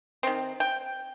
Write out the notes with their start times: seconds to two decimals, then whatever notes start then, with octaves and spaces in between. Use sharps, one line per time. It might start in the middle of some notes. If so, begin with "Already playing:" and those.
0.23 D#3 C4
0.60 G5